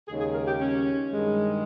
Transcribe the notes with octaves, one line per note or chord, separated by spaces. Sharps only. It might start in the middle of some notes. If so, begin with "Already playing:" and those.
D#2 C#3 G#3 G#4
G#4
A#4
G4
C#4
G2 D#3 G#3